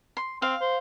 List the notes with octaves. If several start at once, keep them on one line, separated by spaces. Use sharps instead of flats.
C6
C4 F5
C5